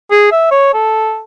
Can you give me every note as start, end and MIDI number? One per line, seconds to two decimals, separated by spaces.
0.11 0.28 68
0.31 0.49 76
0.51 0.74 73
0.74 1.20 69